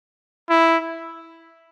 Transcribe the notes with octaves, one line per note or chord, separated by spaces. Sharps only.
E4